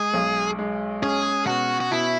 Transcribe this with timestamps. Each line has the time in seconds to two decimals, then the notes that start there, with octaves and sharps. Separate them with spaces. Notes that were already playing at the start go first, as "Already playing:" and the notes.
Already playing: G#3 G#4
0.14 B1
0.59 G#3
1.02 C#4 G#4
1.47 B2 F#4
1.80 F#4
1.91 B2 E4